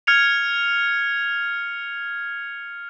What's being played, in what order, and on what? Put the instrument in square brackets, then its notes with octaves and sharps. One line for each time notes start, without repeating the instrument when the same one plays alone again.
[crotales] F6 G#6 C#7 F7